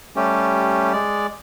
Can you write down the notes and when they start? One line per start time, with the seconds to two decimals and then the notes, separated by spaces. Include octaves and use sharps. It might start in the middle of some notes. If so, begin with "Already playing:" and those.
0.16 G3 A3 C#4 G4
0.93 G#3 D5